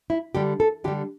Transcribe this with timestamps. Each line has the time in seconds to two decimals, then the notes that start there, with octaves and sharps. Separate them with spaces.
0.10 E4
0.35 D3 G3 G4
0.60 A4
0.84 D3 G4
0.88 G3